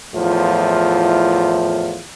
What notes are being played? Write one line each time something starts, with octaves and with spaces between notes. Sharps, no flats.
E2 A2 F3 F4